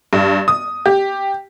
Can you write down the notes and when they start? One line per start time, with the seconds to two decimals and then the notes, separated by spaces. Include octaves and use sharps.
0.13 G2
0.48 D#6
0.86 G4